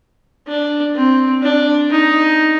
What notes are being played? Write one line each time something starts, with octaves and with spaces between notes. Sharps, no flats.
D4
C4
D4
D#4